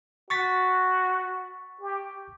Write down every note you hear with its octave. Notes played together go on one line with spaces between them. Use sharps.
F#4 C#6 A6 B6
G4